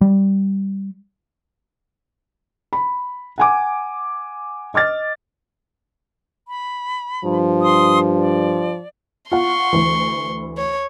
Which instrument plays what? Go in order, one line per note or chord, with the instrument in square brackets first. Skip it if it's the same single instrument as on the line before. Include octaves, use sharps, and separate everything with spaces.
[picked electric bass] G3
[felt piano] B5
F#5 G#5 D6
D#5 D6 F6 A6
[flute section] B5
[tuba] G2 [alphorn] F3
[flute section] C6 D#6
D5
[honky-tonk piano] F4 F#5 [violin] C6 C#6
[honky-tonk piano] D2 E3
[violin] C#5